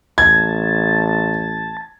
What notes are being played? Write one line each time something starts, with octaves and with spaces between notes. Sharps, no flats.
A1 A5 G#6